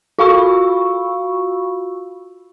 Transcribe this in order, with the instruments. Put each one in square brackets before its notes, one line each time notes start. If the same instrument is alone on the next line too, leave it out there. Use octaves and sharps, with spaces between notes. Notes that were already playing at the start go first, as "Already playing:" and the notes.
[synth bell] F4 F#4 F5 B5 C#6 E6